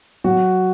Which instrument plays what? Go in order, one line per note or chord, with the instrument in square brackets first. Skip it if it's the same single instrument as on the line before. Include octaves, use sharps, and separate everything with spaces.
[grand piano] F#3 F#4